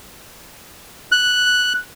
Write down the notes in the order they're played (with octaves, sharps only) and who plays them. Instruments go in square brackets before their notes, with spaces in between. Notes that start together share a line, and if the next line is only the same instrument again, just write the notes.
[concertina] F#6